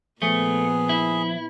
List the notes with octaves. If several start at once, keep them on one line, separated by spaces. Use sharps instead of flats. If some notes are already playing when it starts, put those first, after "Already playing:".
A#2 F3 A3 B3 G#4
E4